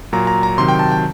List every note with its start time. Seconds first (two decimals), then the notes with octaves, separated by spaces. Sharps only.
0.13 A#2 F#3 A#5
0.27 A#5
0.43 A#5
0.58 C3 D#3 F#3 C6
0.69 G5
0.79 A5
0.92 G5